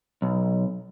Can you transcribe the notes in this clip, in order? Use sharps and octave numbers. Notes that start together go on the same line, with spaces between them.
B1